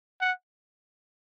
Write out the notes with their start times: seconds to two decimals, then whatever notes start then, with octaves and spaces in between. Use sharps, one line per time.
0.21 F#5